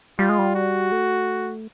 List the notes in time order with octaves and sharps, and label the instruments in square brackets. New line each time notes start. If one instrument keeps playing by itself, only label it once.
[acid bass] G3 [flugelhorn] F4
[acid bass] G#3
G3
[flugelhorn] F#4
[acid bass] A3